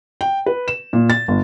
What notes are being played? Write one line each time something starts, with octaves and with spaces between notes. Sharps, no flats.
G5
B4
E7
A#2
A6
G1